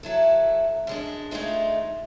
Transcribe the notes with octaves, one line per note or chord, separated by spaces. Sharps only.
F#3 E4 A4
F#2 G#3 D4
G#3 A3 D4 D#4 F4